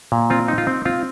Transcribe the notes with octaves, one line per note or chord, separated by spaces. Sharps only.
A#2
C4 F4
D#4
F4
C4
C4 F4